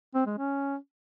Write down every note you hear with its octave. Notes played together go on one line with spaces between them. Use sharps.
C4
G#3
C#4